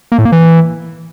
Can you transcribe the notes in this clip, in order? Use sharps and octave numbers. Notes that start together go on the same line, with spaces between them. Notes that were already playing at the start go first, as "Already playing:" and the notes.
A#3
A2
A#3
E3